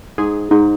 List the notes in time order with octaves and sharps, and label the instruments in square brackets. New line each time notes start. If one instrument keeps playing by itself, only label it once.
[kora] G#2 [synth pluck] G#4
[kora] G#2 [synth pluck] D#4